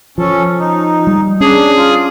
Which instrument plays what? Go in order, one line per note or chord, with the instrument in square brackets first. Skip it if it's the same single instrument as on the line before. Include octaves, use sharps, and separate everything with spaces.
[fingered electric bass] F3 [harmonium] C#4 A4
[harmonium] D#4
[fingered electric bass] G3
[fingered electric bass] C#4 [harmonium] D4 [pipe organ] G#4
[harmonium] F4